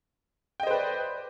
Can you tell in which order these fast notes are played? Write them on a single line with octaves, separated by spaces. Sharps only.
G5 D#5 C5 B4 D5